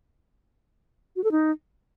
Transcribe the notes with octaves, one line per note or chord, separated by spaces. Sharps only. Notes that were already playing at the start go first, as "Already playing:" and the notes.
F#4
A4
D#4